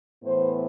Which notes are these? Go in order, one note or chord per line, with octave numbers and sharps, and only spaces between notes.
A2 E3 B3 C5